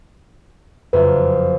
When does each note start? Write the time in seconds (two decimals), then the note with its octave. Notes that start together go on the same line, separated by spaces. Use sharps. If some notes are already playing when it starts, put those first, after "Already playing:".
0.93 F#1 F2 B4